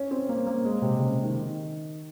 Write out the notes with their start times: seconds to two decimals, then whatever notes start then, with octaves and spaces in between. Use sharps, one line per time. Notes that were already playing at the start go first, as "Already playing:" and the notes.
Already playing: C#4
0.11 C4
0.29 A#3
0.46 A#3
0.64 G#3
0.82 C3
0.99 C#3
1.23 D#3